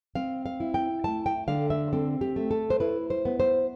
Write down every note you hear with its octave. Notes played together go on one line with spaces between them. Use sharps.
C4 F5
F5
E4
G5
A3 A5
G5
D3 F5
E5
C4 A4
G4
A3
A4
C5
E4 B4
C5
B3
C5